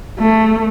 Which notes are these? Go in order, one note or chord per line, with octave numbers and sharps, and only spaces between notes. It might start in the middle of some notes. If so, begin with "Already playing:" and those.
A3